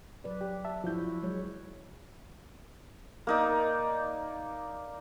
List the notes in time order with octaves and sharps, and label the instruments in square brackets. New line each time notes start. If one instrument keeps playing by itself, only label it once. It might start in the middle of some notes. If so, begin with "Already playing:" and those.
[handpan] F#3 B4 D5
[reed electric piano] G4
E5 A5
[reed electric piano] F3 G6 [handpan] E4 F#4
[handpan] F#3 G#3 C#5
[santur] A#3 D#4 D5